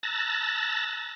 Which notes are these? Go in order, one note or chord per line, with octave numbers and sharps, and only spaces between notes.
A5 A#5 E6 F#6 A6 A#6